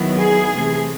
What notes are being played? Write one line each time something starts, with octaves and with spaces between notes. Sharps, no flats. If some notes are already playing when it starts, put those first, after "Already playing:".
Already playing: D#3 F#3 B3 E4
G#4
C3 E3 A3